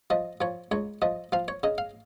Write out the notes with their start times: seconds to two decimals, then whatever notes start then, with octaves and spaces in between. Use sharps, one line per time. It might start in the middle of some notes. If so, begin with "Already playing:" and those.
0.10 F3 D#5
0.41 F3 C#5
0.71 C#2 C#5
1.02 F3 D#5
1.32 F3 F5
1.48 C#5
1.63 C#3 D#5
1.78 F5